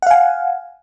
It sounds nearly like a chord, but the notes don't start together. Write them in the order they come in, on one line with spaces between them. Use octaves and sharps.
F#5 F5 G#5